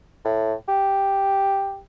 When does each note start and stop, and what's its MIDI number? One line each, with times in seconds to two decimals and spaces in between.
0.25 0.53 45
0.68 1.79 67